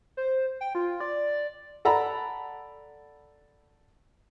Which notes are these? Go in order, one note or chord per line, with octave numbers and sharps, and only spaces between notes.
C5
G5
F4
D5
A4 D5 F#5 A#5 B5